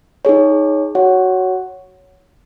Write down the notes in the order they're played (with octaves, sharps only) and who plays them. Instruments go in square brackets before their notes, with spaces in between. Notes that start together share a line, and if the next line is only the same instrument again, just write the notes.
[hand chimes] D#4 G#4 C#5
F#4 C#5 F#5